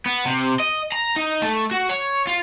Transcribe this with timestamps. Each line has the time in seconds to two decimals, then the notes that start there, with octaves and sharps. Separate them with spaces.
0.06 B3
0.25 C3
0.60 D#5
0.92 A#5
1.16 D#4
1.42 A3
1.71 F#4
1.89 C#5
2.27 F4